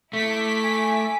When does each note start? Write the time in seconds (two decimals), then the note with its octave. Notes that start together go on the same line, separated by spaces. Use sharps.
0.13 A3 E4 D6 B6
0.63 G#5